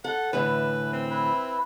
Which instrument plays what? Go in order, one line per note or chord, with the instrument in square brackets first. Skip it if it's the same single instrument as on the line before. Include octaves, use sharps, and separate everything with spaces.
[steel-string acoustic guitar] A4 [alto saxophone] F#5
[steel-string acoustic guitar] A2 D3 E3 [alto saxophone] B4
[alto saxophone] C4
[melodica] E4 B4